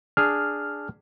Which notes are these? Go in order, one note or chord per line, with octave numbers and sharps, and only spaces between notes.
D4 G#4 F6